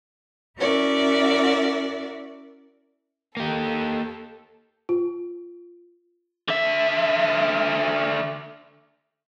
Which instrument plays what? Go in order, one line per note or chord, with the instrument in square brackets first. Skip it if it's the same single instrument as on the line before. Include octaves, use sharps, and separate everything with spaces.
[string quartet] C#4 E4 F#4 A#4 D5 E5
[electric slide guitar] A#3 G4 [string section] A4
[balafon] F4
[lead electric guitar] D3 E5